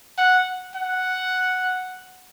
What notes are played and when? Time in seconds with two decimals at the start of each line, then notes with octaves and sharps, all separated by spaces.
0.18 F#5
0.75 F#5